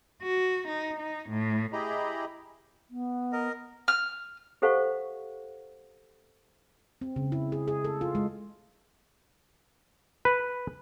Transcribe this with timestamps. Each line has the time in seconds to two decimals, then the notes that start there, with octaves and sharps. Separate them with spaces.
0.22 F#4
0.68 D#4
0.99 D#4
1.30 A2
1.73 E4 G4 G#4 D#5 A#5 B5
2.90 B3
3.33 A#4 D#5
3.88 F6
4.62 G4 A4 C5 F5 F#5 C#6
7.01 C4
7.16 C#3
7.32 E4
7.52 G#4
7.68 G#4
7.85 A4
8.01 F4
8.15 G#3
10.25 B4